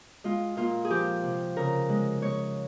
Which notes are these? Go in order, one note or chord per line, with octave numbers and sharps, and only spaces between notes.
G#3 F4
A#2 F4
G#4
F3 G4
C3
C#3 A#4
G#3
G#3 C#5